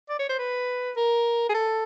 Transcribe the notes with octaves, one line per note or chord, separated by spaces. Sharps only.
D5
C#5
C5
B4
A#4
G#4
A4